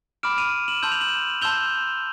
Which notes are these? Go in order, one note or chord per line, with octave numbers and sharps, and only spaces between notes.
B5 D6 F6 D7 E7
D#7 F7
E7 F#7
A5 C6 E6 G6 F#7
F7
E7 F#7
A5 C6 E6 G6 F7 G7